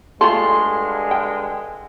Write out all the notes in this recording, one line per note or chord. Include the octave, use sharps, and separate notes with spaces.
G2 D3 G#3 A3 F4 A4 C6
G5